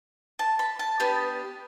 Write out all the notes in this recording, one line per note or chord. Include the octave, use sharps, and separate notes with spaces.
A5
B5
A5
B3 D4 G4